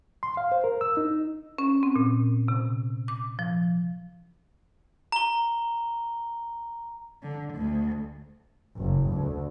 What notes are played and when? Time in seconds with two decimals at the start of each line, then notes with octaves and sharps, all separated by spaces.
0.23 C6
0.37 F5
0.52 C5
0.64 A#4
0.81 E6
0.97 D#4
1.58 C#4
1.83 C4
1.96 A#2
2.48 C3
3.08 D6
3.39 F3
5.12 A#5 G7
7.23 D3
7.54 D2
8.78 F#1
9.12 D2